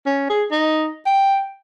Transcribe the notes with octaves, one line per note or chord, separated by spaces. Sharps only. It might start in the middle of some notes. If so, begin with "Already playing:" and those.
C#4
G#4
D#4
G5